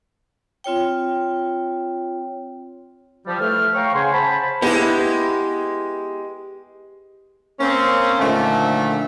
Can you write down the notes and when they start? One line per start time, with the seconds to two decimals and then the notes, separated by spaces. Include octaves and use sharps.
0.64 C4 F4 C#5 G5
3.26 F3 G3
3.40 E3 A3 A4 C5 F6
3.74 C#5 F5 G5 A#5 C#6
3.94 C#3 F#5 G#5 C6
4.13 C5 A5 B5
4.62 G#3 B3 E4 G4
7.60 A#3 C4 C#4
8.19 A#2 D3 D#3 F3 A3